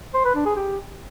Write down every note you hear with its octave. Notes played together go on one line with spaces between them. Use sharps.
C5
B4
D4
G#4
G4